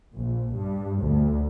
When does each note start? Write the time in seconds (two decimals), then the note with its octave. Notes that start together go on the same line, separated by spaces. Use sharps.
0.15 A#1
0.57 G2
1.04 D2